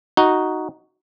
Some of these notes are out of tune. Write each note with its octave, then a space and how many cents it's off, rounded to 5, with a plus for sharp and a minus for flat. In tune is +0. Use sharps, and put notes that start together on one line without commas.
D#4 +0 F#4 +0